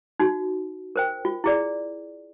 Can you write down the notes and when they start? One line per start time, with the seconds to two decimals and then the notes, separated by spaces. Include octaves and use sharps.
0.20 D#4 F#4
0.96 A#4 C5 G5
1.25 F4
1.44 E4 G#4 D5